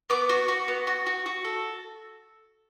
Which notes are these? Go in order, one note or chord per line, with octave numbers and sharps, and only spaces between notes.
B3 D6
F#4
F#4
B3
F#4
F#4
F#4
A4